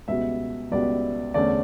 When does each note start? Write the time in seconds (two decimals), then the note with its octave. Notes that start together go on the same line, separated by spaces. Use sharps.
0.08 C#2 B2 G3 B3 E5
0.71 C#2 B2 G3 B3 D5
1.34 E2 D3 A3 C#4 D5